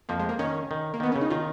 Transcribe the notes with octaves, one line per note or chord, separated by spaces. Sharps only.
F2 F3 A#3
G#3
A#3
D#3 C#4
D#3
A#3
D#3 B3
C#3 C#4
D#4
D#3 F4